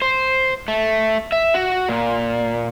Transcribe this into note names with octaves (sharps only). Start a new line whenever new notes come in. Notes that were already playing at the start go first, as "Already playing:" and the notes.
C5
A3
E5
F#4
A#2